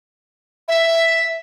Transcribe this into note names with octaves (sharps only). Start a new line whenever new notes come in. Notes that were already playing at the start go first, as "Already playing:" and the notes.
E5